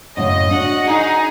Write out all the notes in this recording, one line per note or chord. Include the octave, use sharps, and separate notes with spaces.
F#2 A2 C#3 D#5
D4 F#4 F#5
D#4 G#4